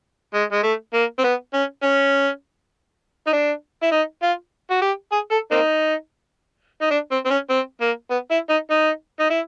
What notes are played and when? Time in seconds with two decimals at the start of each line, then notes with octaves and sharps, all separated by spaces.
0.34 G#3
0.52 G#3
0.63 A3
0.94 A#3
1.18 C4
1.24 B3
1.54 C#4
1.83 C#4
3.27 D#4
3.33 D4
3.83 E4
3.92 D#4
4.22 F4
4.70 F#4
4.82 G4
5.12 G#4
5.31 A4
5.51 A#3 C4 D#4
6.82 D#4
6.91 D4
7.11 C4
7.25 C4
7.30 C#4
7.50 C4
7.81 A#3
8.10 B3
8.31 E4
8.50 D#4
8.70 D#4
9.19 D#4
9.30 E4